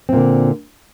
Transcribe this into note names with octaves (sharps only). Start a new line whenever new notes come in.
A#2 D3 C4